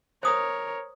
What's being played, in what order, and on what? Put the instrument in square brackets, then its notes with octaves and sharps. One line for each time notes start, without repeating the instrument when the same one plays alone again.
[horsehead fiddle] A#4 C#5 [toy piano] C5 D#6